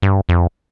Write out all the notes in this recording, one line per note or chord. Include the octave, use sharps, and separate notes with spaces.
G2
F2